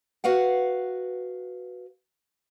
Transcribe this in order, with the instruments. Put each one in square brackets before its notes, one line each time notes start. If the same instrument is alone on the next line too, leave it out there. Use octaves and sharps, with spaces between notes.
[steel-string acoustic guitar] F#4 B4 F5 F#5